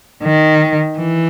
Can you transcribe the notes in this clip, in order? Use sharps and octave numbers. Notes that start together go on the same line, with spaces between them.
D#3
E3